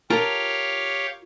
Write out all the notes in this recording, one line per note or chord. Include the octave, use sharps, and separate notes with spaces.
F4 G4 A4 A#4 C#5 F5